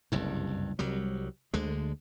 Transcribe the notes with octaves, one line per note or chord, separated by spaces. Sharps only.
F#1 C2 G2
C2 F#3 G3
D2 D3 G#3